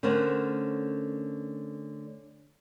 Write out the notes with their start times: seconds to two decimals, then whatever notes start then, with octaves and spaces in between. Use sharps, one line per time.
0.03 D3 A3 C#4 A#4 C5 F#5